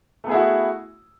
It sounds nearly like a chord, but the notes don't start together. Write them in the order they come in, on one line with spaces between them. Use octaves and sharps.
A3 B3 G#4 E4 F#4